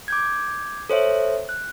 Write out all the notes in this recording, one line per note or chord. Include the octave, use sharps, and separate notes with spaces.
D6 G6 G#6
A4 C5 C#5 E5
F#6